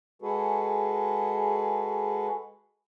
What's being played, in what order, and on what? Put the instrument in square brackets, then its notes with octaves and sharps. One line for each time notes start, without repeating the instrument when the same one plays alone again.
[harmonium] G#3 F#4 G#4 A4 B4